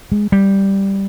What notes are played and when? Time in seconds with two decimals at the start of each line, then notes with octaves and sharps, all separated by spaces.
0.12 G#3
0.32 G3